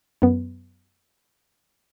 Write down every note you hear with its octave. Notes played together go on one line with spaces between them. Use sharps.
F#2 B3